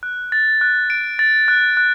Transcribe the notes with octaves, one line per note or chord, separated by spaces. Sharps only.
F#6
A6
F#6
D7
A6
F#6
F#6